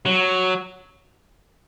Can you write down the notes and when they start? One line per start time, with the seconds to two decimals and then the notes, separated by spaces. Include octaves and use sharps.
0.06 F#3